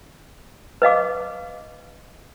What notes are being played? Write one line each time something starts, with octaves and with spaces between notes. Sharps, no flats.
B4 D#5 F5 D6